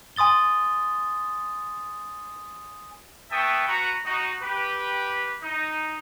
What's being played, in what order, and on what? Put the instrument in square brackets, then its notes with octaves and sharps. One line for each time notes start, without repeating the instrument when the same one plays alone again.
[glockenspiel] G#5 C6 D#6 A6 G7
[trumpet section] B3 E5 G5 A5 C#6 D#6
F#4 B4 A#5 C#6
D#4 F#4
G4 B4
D#4